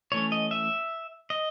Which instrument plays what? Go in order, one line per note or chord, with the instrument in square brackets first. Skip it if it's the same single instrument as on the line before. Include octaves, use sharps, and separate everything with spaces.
[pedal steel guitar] E3 A3 C#4 C#5
D#5
E5
D#5